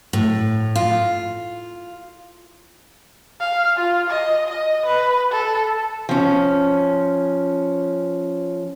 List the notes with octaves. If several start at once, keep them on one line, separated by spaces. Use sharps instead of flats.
A2
F4
F5
F4
D#5
D#5
B4
A4
F3 C#4